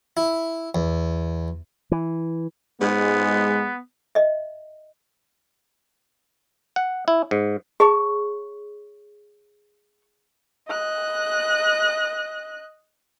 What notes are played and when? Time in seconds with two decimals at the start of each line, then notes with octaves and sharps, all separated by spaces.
0.17 E4
0.75 E2
1.92 E3
2.81 G#2 G#3 B3
4.15 D#5 E5
6.76 F#5
7.08 E4
7.31 G#2
7.80 G#4 C#5 A5 C#6
10.68 D#5 F#6